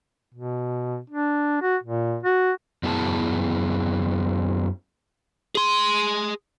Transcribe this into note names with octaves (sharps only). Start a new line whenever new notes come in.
B2
D4
F#4
A#2
F#4
F#2 B3 E4 G#4 A5
G#4 C6